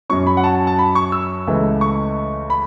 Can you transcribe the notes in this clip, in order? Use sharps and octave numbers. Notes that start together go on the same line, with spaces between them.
F#2 F#3 C#4 C#6
B5
F#5
A5
A5
A5
B5
C#6
E6
C#2 C#3 E3 A3
C#6
B5